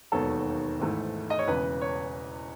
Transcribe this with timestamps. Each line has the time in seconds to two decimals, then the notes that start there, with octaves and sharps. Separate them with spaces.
0.12 E1 D#2 D#3 F#3 B3 A4
0.79 G#1 G#2 E3 A3
1.30 D#5
1.39 C#5
1.47 E1 E2 C#3 B4
1.81 C#5